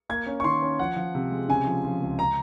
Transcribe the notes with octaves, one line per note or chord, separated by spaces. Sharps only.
A#3 G#6
C#4
C#6
D#3 C6
C#4
F3 F#5
F3
C3
G#3
C#3 G#5
F3
F3
C#2
A#5